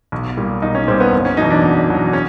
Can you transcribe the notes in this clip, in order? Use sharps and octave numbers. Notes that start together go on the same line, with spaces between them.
B1
A#2 G3
B1 D#4
C#4
A#2 G3 C4
B3
F#1
C#4
E2 B2 F#3 D#4
D4
F#1
E2 B2 F#3
C#4